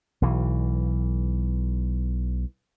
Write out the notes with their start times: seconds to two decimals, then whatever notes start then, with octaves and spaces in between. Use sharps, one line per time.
0.22 B1 E3